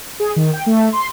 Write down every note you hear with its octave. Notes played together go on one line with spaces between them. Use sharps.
G#4
D#3
G5
A3
C6